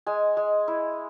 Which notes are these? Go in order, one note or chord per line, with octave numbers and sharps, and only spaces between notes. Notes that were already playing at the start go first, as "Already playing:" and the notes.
G#3 G#5
G#3
E4